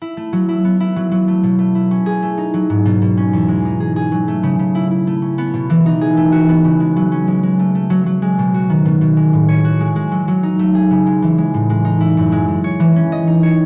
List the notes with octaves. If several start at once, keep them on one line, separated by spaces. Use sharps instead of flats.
E4
A3
F#3
E4
B3
E4
F#3
F#3
A3
B2
A3
E4
C#4
G#4
A3
D#4
F#3
G#2
B2
B2
C#4
E2
G#3
D#4
G#4
G#4
F#3
A3
C#3
C#3
E4
E4
A3
C#4
B3
B2
E3
D#4
G#4
A3
F#4
B3
C#3
G#3
F#3
C#4
G#3
G#3
A3
A3
F#3
F#3
G#3
B2
F#4
D#3
B2
B2
G#3
A2
C#5
F#4
G#3
G#3
F#3
F#3
D#4
A3
G#4
C#3
G#3
E3
G#3
A2
G#3
D#4
E4
F#2
G#3
G#3
C#5
E3
C#4
D#5
D#4
C#5